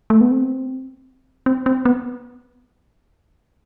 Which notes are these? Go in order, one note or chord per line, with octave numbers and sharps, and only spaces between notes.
A3
B3
C4
C4
C4
B3